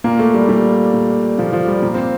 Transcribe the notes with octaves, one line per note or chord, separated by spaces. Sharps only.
A#2 A#3
A3
G3
A#2 G3
A#2
A#2 F3
F3
G3
A#2 A#3
C4